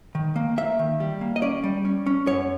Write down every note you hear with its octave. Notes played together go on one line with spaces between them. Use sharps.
D#3
A#3
A#3 E5
D#3
G3
A#3
D#5
C#4 D5
G3
C#4
C#4
F#2 C#5